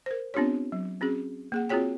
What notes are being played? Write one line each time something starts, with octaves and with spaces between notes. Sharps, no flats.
A#4 C5
B3 C4 D4 F4 G4 C#5
F#3
C4 C#4 F#4 G#4
A#3 G#4 F#5
C4 F4 F#4 G#4 C#5 G5